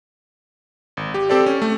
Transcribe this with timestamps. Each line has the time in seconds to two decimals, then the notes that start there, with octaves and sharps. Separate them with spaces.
0.97 G#1
1.14 G4
1.29 C4 G4 A4 C5 D5
1.46 C#4
1.62 A3